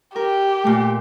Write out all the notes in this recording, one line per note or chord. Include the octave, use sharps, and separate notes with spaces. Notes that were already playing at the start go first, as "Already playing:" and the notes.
G4 A#4
A#2 A3